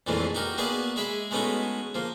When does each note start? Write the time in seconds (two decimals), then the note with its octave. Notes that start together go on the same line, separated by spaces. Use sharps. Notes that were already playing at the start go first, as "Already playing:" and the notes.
0.07 F2 A#2 E3 G#3 A3
0.35 D#4 F#4 G4 A#4
0.58 A#3 B3 F#4 G#4 D5 F#5
0.96 G#3 G#4 E5 B5
1.31 G#3 A3 B3 C#4 D#4 F#4
1.95 F3 A#3